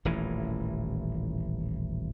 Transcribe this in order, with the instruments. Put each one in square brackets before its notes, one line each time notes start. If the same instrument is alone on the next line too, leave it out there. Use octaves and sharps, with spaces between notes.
[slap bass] D#1 A1 A2 E3